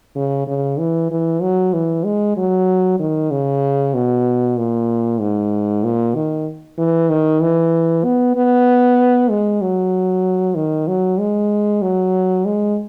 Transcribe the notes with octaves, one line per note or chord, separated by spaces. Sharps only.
C#3
C#3
E3
E3
F#3
E3
G#3
F#3
D#3
C#3
B2
A#2
G#2
A#2
D#3
E3
D#3
E3
B3
B3
G#3
F#3
D#3
F#3
G#3
F#3
G#3